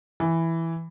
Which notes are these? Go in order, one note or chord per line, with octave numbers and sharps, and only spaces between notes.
E3